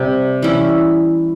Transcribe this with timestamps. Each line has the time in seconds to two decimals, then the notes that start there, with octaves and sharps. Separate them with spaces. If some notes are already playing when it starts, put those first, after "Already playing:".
Already playing: C3 G3
0.42 E3 G3 C#4 E4